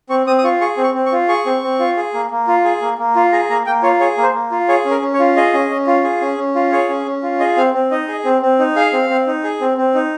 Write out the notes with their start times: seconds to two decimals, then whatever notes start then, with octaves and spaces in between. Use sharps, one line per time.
0.10 C4 C#6
0.27 C4 D#6
0.38 D#6
0.44 F4 C#6
0.61 G#4 C#6
0.77 C4
0.83 C#6
0.94 C4
1.06 C#6
1.12 F4
1.28 G#4 C#6
1.46 C4
1.62 C4
1.79 F4
1.97 G#4
2.14 A#3
2.31 A#3
2.47 F4
2.64 G#4
2.82 A#3
2.98 A#3
3.16 F4
3.32 G#4 A#5
3.50 A#3 A#5
3.66 A#3 G5
3.83 F4 C#5
4.00 G#4 C#5
4.17 A#3
4.23 C5
4.34 A#3
4.51 F4
4.68 G#4 C#5
4.85 C#4
4.91 A#4
5.02 C#4
5.14 C#5
5.19 F4
5.36 G#4 D#5
5.54 C#4
5.70 C#4
5.87 F4
6.04 G#4
6.21 C#4
6.38 C#4
6.55 F4
6.72 G#4 C#5
6.89 C#4
7.06 C#4
7.23 F4
7.40 G#4 D#5
7.57 C4 F5
7.74 C4
7.91 D#4 D#5
8.08 G#4
8.25 C4
8.42 C4
8.59 D#4
8.76 G#4 F5
8.93 C4
9.10 C4
9.27 D#4
9.44 G#4
9.61 C4
9.78 C4
9.94 D#4